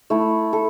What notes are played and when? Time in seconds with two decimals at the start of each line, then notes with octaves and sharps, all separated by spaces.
0.10 A3 E4
0.53 A4